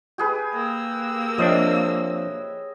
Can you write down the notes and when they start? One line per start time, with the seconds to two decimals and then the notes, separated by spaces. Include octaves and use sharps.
0.18 G4 G#4 B4
0.53 A#3 G5 E6
1.38 F3 C4 D4 C#5 D#5 E5